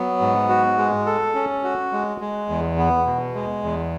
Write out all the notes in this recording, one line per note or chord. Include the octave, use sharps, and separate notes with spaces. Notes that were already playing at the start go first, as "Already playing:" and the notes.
Already playing: F#3 B3
G#2
F#4
G#3
A4
C#4
F#4
G#3
G#3
E2
B3
B2
G#3
E2